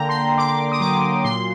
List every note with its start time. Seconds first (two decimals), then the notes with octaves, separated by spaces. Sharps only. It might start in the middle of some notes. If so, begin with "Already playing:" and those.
Already playing: D3 A#3 G5 A#5
0.09 C6
0.37 D3 D6
0.72 D#6
0.80 F#3 D6
1.24 A#2 C6